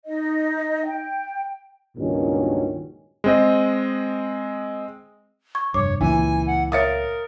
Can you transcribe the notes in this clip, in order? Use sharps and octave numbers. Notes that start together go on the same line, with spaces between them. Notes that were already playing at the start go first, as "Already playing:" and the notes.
D#4 D#5
G5
C#2 G2 A#2 D#3 F#3 C#4
G#3 C4 D#5
C#6 G#6
F1 G2 C#5 D6
C#2 A#2 E3 G#5
F#5
A#4 C#5 E5 F5 D#6 A6 C#7